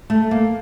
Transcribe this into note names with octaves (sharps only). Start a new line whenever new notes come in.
A3
A#3